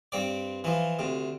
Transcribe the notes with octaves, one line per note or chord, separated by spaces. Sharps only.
G2 C4 D5
E3 F3
D2 C3